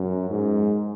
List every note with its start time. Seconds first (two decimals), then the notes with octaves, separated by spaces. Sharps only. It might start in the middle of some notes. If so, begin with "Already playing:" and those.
Already playing: F#2
0.30 G#2